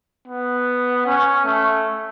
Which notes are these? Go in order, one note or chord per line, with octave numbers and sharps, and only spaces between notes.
B3
C#4
A3